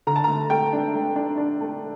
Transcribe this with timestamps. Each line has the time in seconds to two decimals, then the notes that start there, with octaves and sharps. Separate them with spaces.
0.07 D3 A#5
0.16 A5
0.24 A3 A#5
0.50 A3 G5
0.73 D4
0.94 A3
1.16 D4
1.38 D4
1.61 A3